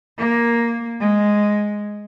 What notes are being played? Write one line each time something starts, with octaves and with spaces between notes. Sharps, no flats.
A#3
G#3